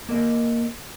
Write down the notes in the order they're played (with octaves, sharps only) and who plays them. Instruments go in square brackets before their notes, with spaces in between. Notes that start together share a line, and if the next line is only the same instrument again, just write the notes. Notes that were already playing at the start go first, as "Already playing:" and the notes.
[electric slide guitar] A#3 A#4 D#5